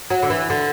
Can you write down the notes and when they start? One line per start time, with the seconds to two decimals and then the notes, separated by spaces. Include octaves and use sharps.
0.10 F#3
0.23 D3
0.30 E3
0.50 D3